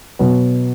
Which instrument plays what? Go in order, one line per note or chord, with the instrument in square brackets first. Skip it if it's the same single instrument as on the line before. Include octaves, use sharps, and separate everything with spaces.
[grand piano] B2 F#3 B3